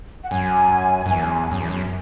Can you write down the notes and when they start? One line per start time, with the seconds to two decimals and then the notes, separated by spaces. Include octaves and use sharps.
0.24 F#5
0.30 F#2 G#5
1.06 F#2
1.11 E2
1.51 F#2
1.60 E2
1.69 F#2